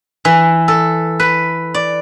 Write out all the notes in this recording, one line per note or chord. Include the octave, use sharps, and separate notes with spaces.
E3
A4
B4
D5